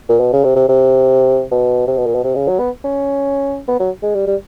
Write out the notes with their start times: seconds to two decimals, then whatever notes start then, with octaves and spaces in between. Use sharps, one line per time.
0.09 A#2
0.20 B2
0.33 C#3
0.44 C3
0.56 C3
0.68 C3
1.51 B2
1.87 C3
1.97 B2
2.06 A#2
2.15 B2
2.24 C3
2.35 C#3
2.48 F#3
2.59 B3
2.84 C#4
3.68 B3
3.79 F#3
4.03 G#3
4.15 G3
4.27 G3